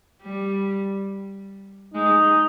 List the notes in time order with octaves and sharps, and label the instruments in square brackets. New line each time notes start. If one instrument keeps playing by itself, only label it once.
[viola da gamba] G3
[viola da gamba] G#3 [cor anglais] D#4